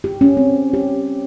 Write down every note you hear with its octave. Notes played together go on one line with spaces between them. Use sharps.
G4
C#4
C4
G4